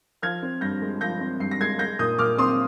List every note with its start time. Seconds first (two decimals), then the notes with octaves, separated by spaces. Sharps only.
0.22 F3 F6 G#6
0.42 C4
0.61 G2 G6 A#6
0.82 G#3
1.01 F3 G6 A#6
1.20 C4
1.40 G2 C7
1.51 A#6
1.60 G#3 G#6 C7
1.79 G#3 G6 A#6
1.99 A#2 D#6 G6
2.18 A#2 D6 F6
2.38 C4 C6 D#6